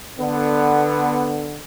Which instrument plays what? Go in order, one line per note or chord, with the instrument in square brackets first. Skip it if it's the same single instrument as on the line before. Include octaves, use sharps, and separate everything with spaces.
[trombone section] D3 B3